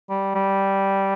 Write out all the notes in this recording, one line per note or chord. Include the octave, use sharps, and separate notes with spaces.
G3
G3